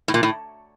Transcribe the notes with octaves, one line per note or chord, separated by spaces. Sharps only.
A2
A#2
A2